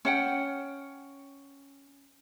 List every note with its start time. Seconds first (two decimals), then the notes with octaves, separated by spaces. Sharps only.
0.05 C#4 F#5 G5